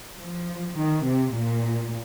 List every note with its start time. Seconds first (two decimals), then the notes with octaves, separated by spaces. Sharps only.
0.20 F3
0.78 D#3
1.05 C3
1.34 A#2